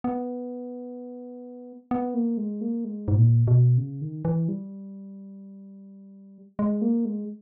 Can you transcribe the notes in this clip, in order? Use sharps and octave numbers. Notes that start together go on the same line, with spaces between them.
B3
B3
A#3
G#3
A#3
G#3
G#2
A#2
B2
C#3
D#3
E3
G3
G#3
A#3
G#3